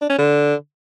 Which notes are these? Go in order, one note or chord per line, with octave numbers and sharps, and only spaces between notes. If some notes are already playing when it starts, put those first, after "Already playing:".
D4
C#4
D3